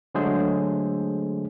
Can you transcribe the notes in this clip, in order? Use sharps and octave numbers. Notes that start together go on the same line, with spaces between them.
D3 F#3 G#3 A3 G#4 C5